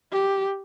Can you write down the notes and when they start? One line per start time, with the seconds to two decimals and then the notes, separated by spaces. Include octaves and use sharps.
0.12 G4